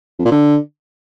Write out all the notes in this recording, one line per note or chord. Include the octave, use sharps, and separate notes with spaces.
F2
A#2
D3